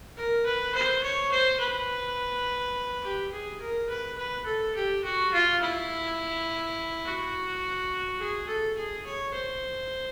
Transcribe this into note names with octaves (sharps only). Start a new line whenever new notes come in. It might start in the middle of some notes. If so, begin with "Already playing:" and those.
A#4
B4
C5
C#5
C5
B4
G4
G#4
A#4
B4
B4
A4
G4
F#4
F4
E4
F#4
G#4
A4
G#4
C#5
C5